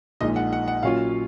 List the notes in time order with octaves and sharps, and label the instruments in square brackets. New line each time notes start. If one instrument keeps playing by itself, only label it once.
[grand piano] A#1 A#2 G#3 D#4 D#5
F#5
F#5
F#5
A#2 F#3 C#4 F4 F5